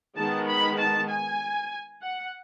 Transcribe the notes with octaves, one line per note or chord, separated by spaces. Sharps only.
D#3 G#3 B3 A5
B5
A5
G#5
F#5